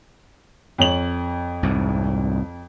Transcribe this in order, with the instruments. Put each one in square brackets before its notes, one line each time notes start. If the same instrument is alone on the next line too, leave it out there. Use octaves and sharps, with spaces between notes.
[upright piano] F2 C#5 F#7
[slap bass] C2 G#2